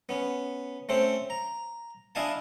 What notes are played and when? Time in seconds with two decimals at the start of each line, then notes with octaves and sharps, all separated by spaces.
0.09 B3 C#4
0.89 A3 C4 C#4 C5
1.30 A#5
2.15 D4 E4 D#5 F5 G#5 A5